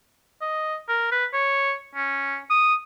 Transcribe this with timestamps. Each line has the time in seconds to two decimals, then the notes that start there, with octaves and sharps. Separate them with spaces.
0.42 D#5
0.89 A#4
1.12 B4
1.33 C#5
1.95 C#4
2.50 D#6